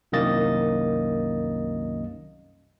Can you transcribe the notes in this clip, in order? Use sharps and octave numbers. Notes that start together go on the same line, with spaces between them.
C2 F#2 D#3 A#3 D#5 A6